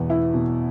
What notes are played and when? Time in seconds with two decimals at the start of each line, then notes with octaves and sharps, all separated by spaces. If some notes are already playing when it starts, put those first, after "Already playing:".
Already playing: E2 B2 B3
0.10 E4
0.34 B2